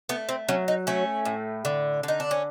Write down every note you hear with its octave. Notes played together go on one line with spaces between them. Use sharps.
A3 B3
C4
F#3 C#4
D#4
A3 C#4
A2
D3
D3 D#4
D4
C#4